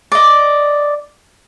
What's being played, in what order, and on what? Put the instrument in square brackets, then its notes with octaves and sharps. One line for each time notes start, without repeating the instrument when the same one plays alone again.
[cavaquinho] D5 D#5